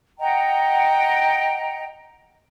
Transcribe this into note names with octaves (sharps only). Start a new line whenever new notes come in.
D#5 F#5 G5 A#5